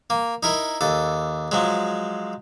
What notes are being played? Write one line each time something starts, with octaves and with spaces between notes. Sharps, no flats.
A#3
D#4 E4 A#4
D#2 A4
F3 F#3 G#3